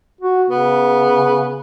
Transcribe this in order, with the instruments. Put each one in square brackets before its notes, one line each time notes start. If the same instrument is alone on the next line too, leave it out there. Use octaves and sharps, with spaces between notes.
[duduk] F#4
[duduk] C#3 [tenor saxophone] B3